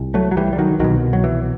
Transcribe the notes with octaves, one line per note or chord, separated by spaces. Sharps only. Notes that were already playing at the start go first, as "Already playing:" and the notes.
Already playing: C2
F#3 A3
F#3
E3 G3
G3
D#3 F#3
C2 B2 D#3 F#3
F#3
E3